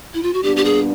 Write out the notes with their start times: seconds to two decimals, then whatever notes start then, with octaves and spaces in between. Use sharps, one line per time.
0.14 E4
0.23 F4
0.33 F#4
0.43 A#2 G3 B3 D4 G4
0.56 G4
0.65 G#4